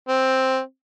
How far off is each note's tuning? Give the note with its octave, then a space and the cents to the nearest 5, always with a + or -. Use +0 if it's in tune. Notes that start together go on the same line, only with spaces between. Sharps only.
C4 +5